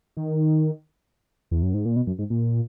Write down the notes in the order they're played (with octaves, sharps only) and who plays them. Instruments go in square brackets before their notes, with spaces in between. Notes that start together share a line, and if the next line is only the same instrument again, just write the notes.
[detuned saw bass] D#3
E2
F#2
G#2
A#2
B2
F#2
G#2
A#2